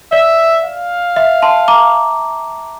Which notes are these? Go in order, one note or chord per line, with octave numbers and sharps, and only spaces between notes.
D5 E5
F5
E5
A5 C6
A#5 D6